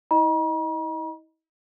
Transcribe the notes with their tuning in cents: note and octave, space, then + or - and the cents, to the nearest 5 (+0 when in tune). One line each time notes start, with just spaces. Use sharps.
E4 -40 D#5 +0 A#5 +45